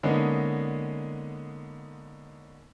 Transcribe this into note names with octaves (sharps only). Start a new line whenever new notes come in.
D3 G#3 A#3 B3 C#4 D#4